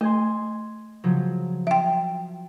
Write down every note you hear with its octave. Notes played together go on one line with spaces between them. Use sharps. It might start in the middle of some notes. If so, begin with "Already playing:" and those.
A3 D#5 G#5 C6
C#3 F3 F#3
E5 G5 D7